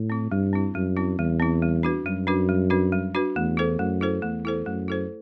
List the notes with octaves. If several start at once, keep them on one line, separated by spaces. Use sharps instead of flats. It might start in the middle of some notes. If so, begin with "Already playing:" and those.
Already playing: A2
C4 E4
G2 G3
C4 E4
F#2 G3
C4 E4
E2 G3
C4 E4
G3
D4 F#4 B4
F#2 G3
D4 F#4 B4
G3
D4 F#4 B4
G3
D4 F#4 B4
E2 A3
E4 A4 C5
F#2 A3
E4 A4 C5
E2 A3
E4 A4 C5
F#2 A3
E4 A4 C5